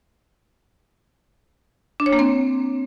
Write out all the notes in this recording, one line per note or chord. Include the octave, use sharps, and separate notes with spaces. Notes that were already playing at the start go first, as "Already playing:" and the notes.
D4
C#5
A#3
C4